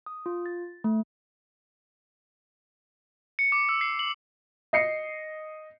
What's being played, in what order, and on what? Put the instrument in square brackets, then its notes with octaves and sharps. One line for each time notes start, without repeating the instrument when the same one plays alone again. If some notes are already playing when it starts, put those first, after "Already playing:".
[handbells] D#6
F4
A6
A3
[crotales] C#7
D6
E6
C7
F#7
[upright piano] D#5 C7 C#7